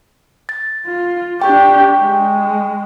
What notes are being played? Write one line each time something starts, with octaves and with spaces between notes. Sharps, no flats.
A6
F4
D4 G4 G5 C#6
G#3